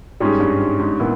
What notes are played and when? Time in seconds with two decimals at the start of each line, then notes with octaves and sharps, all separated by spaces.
0.20 G#2 G3 C#4 G#4
0.40 G2
0.60 G#2
0.79 G#2
1.00 A#2 B3 E4